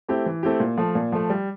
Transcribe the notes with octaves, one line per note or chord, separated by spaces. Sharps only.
A3 C4 E4 G4
E3
A3 C4 E4 G4
A#2
F3 A3
A#2
F3 A3
G3